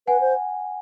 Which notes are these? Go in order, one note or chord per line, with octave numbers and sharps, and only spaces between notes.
B4 F#5 G#5
C5